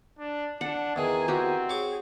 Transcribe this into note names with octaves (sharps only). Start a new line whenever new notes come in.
D4
D4 F#5 A5
E2 D#3 G#4 G#5 A#5
C4 F#4 G4
G#4 C#5 D6